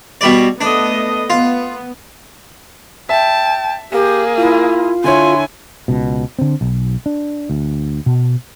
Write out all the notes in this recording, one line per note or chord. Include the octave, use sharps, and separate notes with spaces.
B2 G3 D5
A3 B3 D4 D#5
B3 F4
E5 G5 A5
A#3 G4 G#4
E4 F4
D3 E4 C#5 G#5 C6
C#2 B2
D3 C4
B1
D4
D2
B2